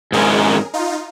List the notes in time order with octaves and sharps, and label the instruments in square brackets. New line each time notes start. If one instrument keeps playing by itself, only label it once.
[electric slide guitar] G#2 D#3 G#3 C#4 E4 [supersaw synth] G#4 A#4
[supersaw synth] D#4 F4